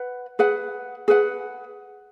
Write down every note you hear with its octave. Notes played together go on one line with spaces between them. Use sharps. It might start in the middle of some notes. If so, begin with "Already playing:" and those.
Already playing: B4 F#5
G#4 B4 F#5
G#4 B4 F#5